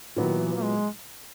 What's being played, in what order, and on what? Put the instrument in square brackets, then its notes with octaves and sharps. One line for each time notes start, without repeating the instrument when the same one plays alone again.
[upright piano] A#2 F#3 B3 E4 [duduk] D#3
[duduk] E3
A#3
G#3